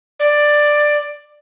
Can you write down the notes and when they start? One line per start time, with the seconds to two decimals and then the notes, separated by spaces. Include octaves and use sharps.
0.20 D5